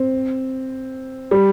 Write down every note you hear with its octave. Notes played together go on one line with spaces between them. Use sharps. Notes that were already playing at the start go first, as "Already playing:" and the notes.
Already playing: C4
G3